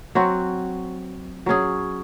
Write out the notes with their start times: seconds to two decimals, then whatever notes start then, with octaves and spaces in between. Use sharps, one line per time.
0.15 F#3 C4 F#4
1.46 F#3 C#4 G#4